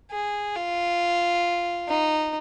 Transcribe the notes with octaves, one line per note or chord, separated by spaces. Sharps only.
G#4
F4
D#4